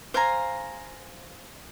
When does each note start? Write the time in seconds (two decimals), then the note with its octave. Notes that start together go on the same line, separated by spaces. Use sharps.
0.14 C5 F5 G#5 A#5